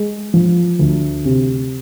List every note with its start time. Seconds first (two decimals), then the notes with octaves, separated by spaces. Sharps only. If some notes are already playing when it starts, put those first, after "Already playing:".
Already playing: G#3
0.34 F3
0.79 D2
1.25 C3